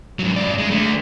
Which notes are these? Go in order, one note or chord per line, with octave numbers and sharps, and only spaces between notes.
G#2 F#3
F#2 D5
G#3
D3 A3